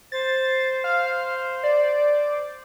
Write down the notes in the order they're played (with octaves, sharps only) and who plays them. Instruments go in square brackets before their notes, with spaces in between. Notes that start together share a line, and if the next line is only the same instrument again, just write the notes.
[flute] C5 [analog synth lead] A6
[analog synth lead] F5
D5